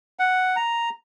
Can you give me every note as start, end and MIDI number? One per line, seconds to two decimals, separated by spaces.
0.19 0.56 78
0.56 0.89 82